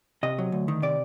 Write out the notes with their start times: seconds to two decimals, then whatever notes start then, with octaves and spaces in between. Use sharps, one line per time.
0.23 C3 D#5
0.38 F#3
0.52 D2
0.68 D#3
0.82 C3 D5